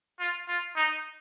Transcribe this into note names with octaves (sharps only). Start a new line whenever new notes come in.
F4
F4
D#4